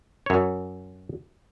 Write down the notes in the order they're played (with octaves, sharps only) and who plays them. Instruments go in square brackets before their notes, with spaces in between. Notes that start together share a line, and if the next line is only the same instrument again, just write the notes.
[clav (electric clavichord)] F#2 C#5